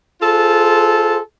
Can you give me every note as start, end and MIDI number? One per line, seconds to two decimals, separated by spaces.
0.22 1.18 65
0.22 1.18 68
0.22 1.18 69
0.22 1.18 72